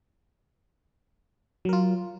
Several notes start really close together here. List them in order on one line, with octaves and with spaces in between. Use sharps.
F#3 A#4 F4